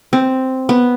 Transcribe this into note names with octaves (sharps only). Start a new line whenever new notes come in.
C4
B3